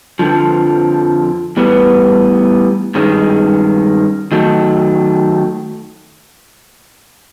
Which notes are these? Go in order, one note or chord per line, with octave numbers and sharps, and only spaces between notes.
F2 D3 F3
A2 E3 G3 B3
G2 D#3 G#3 C#4
D#3 F#3 A3